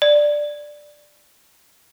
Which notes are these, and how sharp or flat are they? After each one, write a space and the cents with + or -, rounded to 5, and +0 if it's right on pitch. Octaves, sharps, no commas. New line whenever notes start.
D5 +5